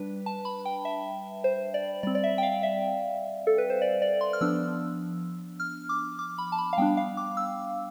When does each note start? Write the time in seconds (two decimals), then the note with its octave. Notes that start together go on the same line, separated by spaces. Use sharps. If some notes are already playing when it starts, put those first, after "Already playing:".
Already playing: G3 D4 B4
0.26 A5
0.45 B5
0.65 G5
0.85 E5
1.44 C5
1.74 D5
2.03 G3 C4 D5
2.15 D5
2.24 E5
2.38 G5
2.43 F5
2.63 E5
3.47 A4
3.58 B4
3.70 C5
3.82 D5
4.02 D5
4.21 C6
4.33 F6
4.41 F3 B3 D4 E6
5.60 F6
5.89 D6
6.19 D6
6.38 B5
6.52 A5
6.58 B5
6.73 F5
6.78 G3 B3 D4 G5
6.97 F5
7.17 D6
7.37 E6